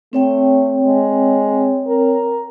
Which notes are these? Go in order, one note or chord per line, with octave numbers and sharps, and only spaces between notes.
A3 C4 C#5 G5
G#3
A#4